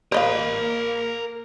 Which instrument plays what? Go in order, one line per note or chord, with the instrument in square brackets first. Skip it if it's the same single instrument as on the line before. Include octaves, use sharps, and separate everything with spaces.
[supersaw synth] A#3 [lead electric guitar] A#4 B5 [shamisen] C5 D#5 F5